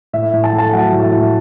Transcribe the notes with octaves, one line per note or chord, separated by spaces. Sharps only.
A2 E5
A2
A5
A3
A5
F#3 F#5
A2
E5
A2